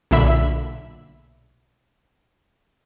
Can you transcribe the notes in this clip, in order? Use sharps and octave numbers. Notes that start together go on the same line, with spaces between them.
B1 A#2 D3 E5 B5